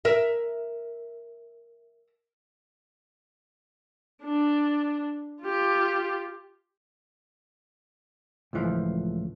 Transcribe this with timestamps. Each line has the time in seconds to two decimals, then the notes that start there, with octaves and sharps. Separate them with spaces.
0.05 A#4 E5
4.23 D4
5.43 F4 G4
8.53 C#2 A2 E3 F3